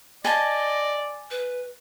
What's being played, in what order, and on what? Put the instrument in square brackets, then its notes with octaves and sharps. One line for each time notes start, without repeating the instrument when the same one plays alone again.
[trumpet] D5 [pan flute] D#5 [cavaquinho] G#5 A5
[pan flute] B4